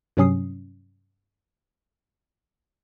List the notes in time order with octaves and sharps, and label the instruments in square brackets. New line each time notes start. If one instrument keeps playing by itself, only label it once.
[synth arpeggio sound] G2 C3 F#3 C#4 D#6 C7